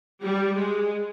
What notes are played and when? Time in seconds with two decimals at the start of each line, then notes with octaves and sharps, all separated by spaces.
0.23 G3
0.56 G#3